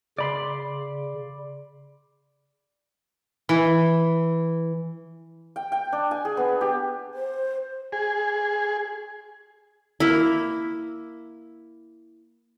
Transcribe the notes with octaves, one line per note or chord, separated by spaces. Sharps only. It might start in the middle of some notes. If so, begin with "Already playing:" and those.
C#3 D5 B5 C6
E3
G5
G5
D4
G#5
G#4
B3
G4
C5
G#4
A#3 E4